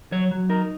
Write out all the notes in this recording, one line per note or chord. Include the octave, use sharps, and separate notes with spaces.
F#3 C#5
F#3
D#4 A#4